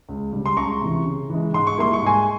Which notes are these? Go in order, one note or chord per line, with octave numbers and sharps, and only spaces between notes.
C#2
C#3 G3
C6
C#2 A#5 C#6
C3 E3
C#3
E3 G#3
G#2 C6
C#6
G3 A#3 E4 C6
C#6
G#2 G#5 C6